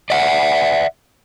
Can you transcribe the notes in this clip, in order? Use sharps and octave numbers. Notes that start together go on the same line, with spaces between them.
D5 E5 F#5